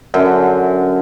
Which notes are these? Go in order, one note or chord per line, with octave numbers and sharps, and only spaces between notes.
F#2 D3